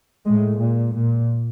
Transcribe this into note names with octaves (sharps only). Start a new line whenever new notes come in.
A2 G#3
A#2
A#2